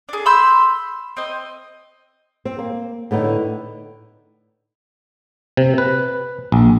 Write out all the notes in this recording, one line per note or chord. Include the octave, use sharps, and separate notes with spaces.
D4 G#4
B5 C6 E6 G6
C4 D#5
C4
A#3
A2 D3 B3 D#4
C3
B4
A#1